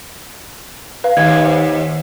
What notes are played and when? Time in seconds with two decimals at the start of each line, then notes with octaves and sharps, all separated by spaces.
1.04 B4 F5
1.17 D#2 G#6
1.46 C5